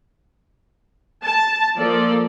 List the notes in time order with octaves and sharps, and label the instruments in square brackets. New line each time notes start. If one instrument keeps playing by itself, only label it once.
[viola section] A5
F3 A#3 A4 D5